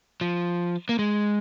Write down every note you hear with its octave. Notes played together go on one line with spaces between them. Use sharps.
F3
A#3
G#3